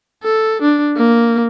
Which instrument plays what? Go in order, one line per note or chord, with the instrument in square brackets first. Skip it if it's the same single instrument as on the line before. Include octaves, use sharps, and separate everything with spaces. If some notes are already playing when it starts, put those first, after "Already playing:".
[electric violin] A4
D4
A#3